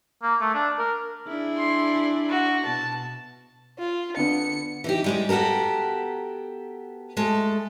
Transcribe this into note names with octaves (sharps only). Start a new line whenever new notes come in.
A#3
A3
D4
A#4
D4 E4 G#4
C6
F#4
B2 A5
F4
D3 B3 C#7
E3 D#4 G4
G3 G#3 C#4
B3 F#4 G4 A4 A#4
G#3 A3 A4